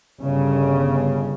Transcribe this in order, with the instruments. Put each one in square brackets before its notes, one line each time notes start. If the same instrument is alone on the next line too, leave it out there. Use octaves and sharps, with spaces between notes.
[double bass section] G1 C#3